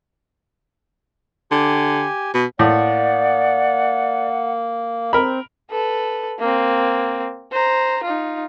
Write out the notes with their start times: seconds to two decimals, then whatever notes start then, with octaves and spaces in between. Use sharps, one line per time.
1.51 D3 G4 G#5
2.34 B2
2.59 A2 A#3 D5 F#5
5.13 C4 A#4 B5
5.71 A4 B4
6.39 A#3 C4
7.52 C5 A#5
8.03 D#4 F4